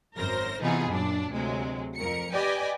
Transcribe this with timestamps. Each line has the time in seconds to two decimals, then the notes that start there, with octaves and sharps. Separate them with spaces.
0.16 G#1 F#2 A#4 C5 A#6
0.60 C3 E3 B3 D#4 F4 G#4
0.89 F#2 A#2 D4
1.32 D2 C3 F#3 G#3
1.95 F2 A#4 C#7
2.33 G4 B4 D5 D#5 G5 G#5